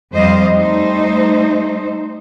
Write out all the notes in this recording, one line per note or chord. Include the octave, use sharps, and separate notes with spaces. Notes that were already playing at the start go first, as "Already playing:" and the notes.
F2 G3 C5 D#5 F5
G3 A3 D#4 C5